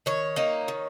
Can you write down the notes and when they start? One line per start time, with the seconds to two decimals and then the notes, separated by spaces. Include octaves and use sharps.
0.06 D#3 C#5
0.36 A#3 D#4
0.68 D#3